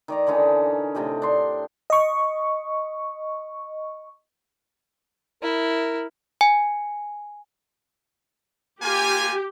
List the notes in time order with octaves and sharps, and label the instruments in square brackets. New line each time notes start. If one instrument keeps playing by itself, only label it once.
[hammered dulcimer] D#3 D5 A#5
D3 E3 C#4 D#4
A2 C3 G4 D#5
D4 C6
[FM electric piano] D#5 C#6
[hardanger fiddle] E4 [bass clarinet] A#4
[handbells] G#5
[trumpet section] A#3 F4 G#5 [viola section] G4